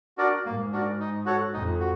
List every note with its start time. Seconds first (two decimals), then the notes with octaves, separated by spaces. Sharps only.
0.18 D4 F#4 A#4 D5
0.45 G#2 A#3
0.73 D4 F#4 A#4 D5
1.00 D#4
1.26 F#4 A4 C#5 F#5
1.53 F2 D#4
1.80 F#4